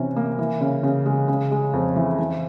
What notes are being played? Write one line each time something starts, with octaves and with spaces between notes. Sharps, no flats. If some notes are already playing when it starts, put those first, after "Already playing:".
Already playing: C3 E3 C#4
A#3
E3
C#3
C#3
G#3
C#3
G#3
F2
E3
E3